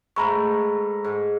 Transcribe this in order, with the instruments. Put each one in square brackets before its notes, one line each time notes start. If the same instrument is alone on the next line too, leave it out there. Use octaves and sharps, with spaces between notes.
[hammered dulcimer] G#2 A3 A#4 [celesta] A#5 B5 C#6
[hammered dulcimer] G#2